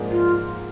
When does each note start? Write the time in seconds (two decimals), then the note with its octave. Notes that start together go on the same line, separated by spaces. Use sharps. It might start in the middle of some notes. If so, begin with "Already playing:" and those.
Already playing: G#2 F3 A#3 D4 G#4
0.11 F4